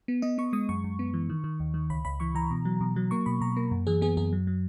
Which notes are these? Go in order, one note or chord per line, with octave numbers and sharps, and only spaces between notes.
B3
B3 D#5
B3 C#6
G#3 D#6
F#2 C#6
F#2
B3
E3
D#3
D#3
D#2
D#3
C#2 B5
C#2 B5
E3 C#6
E3 A#5
B2
F#3
B2
F#3
A#3 C#6
B2 B5
B2 A#5
A#3
F#2
E3 G#4
B3 G#4
F#2 G#4
F#3
F#3